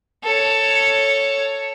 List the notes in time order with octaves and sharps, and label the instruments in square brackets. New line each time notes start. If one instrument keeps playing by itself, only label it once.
[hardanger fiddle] A4 C#5